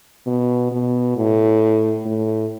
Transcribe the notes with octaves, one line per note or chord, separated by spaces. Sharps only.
B2
B2
A2
A2